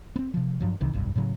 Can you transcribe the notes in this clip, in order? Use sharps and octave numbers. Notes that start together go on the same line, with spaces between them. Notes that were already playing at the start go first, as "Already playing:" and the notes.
B3 C4
C3 F3
G2 F3 F#3
C2 C3 D#3 E3
F1 B1 G2
A2 C#3 F#3